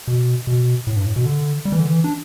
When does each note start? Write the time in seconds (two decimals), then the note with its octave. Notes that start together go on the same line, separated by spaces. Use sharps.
0.08 B2
0.47 B2
0.87 A2
0.96 G2
1.06 A2
1.16 B2
1.25 D3
1.65 G3
1.72 E3
1.80 D3
1.87 E3
2.04 D4